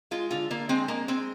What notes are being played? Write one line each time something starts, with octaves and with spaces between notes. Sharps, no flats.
G#3 F4
D3 F4
D3 A#3
G#3 C4
G#3 A#3
G#3 C4